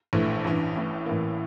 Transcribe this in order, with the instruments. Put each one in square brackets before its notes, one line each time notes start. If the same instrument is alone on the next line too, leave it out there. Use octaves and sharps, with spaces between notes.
[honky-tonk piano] A#1 A2 E3 A3
A1 G2 E3
A1 A2 E3
A1 A2 E3 A#3